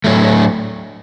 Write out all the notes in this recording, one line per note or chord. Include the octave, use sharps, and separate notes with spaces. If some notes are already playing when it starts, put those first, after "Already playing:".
A2 F#3 A3